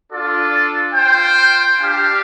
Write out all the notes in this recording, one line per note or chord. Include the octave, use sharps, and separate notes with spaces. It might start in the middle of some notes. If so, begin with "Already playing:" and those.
D4 F4 A4 D5
F4 C5 G5
D4 G4 F5